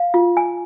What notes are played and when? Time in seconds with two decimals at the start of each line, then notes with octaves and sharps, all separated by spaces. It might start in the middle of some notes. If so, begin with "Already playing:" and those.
Already playing: F5
0.14 F4
0.37 G#5